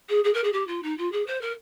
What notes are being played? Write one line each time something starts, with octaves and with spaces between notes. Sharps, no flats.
G#4
G#4
A#4
G#4
G4
F4
D#4
F4
G#4
C5
A#4